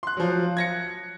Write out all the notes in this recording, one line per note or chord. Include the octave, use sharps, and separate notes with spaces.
C6 F#6
F3 F#3
G#6 A#6 C#7